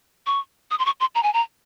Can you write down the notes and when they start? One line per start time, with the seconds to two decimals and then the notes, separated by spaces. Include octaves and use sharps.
0.26 C#6
0.71 D#6
0.79 C6
0.86 C#6
1.00 C6
1.15 A#5
1.23 G#5
1.34 A#5